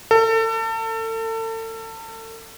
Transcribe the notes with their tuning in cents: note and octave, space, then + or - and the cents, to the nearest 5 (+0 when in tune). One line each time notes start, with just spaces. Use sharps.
A4 +35